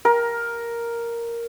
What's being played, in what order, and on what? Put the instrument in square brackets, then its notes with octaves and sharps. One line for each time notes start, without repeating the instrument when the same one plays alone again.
[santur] A#4